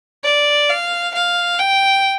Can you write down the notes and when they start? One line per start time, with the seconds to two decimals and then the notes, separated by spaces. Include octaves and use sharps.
0.24 D5
0.69 F5
1.14 F5
1.59 G5